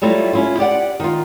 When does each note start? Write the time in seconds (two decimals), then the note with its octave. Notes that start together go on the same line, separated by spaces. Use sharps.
0.02 F#3 G3 A3 E4 F4
0.33 C#4 E4 F4
0.58 G4 D5 F#5
1.00 D#3 F4